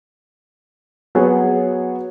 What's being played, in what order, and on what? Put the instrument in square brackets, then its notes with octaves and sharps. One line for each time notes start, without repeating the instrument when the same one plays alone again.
[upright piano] F#3 B3 F#4 G#4 C#5